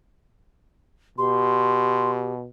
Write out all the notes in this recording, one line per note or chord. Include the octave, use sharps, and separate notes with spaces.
B2 G4 C6